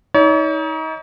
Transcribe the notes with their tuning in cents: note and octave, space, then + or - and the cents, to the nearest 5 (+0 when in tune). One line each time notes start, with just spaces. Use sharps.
D#4 +30 C#5 +40